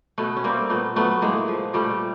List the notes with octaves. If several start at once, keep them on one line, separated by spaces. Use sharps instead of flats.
B2 A3 B3
C#4
G3 A#3 C4
A#2 A3 B3
F#3 A3 B3
A2 G#3 A#3
F3
A#2 G3 A3